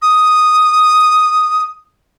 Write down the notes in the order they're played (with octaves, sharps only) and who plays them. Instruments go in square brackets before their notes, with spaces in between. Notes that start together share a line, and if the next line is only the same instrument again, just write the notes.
[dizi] D#6